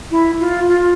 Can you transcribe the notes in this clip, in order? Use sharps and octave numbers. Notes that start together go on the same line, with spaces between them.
E4
F4
F4